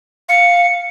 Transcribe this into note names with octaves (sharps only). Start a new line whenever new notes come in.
F5 C#7